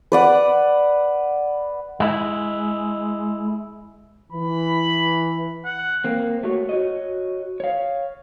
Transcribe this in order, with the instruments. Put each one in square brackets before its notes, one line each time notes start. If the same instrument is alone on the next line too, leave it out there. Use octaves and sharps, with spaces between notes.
[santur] B4 D5 F#5
[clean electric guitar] G#3 E4
[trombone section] E3 [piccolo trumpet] B5
[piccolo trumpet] F#5
[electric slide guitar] A#3 C4
A3 F#4 C#5
F#4 C#5 D#5
C#5 F5